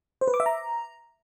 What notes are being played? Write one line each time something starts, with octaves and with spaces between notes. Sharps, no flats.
C5
B4
D6
E5
A#5